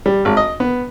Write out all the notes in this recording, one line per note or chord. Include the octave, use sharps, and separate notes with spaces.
G3
G#1
D#5
B3